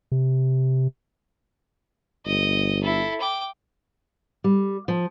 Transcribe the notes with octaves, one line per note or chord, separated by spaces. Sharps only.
C3
G1 D#5
E4 A4
G5 D6
G3
F3